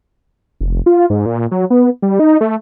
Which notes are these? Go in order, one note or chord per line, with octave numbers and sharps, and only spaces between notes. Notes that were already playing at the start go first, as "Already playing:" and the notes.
F1
F4
G#2
A#2
F#3
B3
G3
D#4
A3